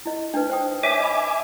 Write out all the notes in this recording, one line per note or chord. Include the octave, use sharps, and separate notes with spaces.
E4 D#5
D4 D#4 B4
C5 G5 D#6
C#5 E5 G#5 D6
D#5 B5